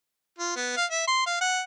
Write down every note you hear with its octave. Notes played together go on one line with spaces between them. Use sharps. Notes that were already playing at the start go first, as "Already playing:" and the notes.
F4
B3
F5
E5
C6
F5
F#5